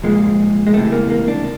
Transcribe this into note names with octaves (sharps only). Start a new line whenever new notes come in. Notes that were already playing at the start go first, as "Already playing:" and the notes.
C2 A#2 F3 G#3
G#3
C#2 C3 E3 A3
A#3
A#3
D4